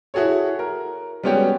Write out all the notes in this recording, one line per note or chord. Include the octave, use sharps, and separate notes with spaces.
E4 F#4 G#4 A4 C#5
A#4
G3 G#3 B3 C#4 F#4 G4